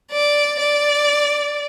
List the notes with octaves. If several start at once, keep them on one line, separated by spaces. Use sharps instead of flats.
D5
D5